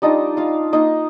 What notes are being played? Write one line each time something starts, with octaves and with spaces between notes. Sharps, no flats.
G3 D4 D#4 F4 D#5
F4 F5
A#3 D#4 F4 D#5